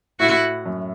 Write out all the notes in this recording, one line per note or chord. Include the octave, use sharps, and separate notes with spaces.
A2 E4 F#4
F#2